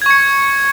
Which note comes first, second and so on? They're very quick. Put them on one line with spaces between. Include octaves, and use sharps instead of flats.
G#6 C#6 C#7